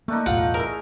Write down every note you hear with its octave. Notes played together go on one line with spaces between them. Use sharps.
A3 A#3 D4 D#4
B1 E2 A2 F4 F#5
E4 G#4 A#4